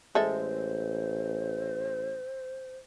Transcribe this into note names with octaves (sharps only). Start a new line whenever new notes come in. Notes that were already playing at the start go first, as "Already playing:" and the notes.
A1 G#3 A4 C5 E5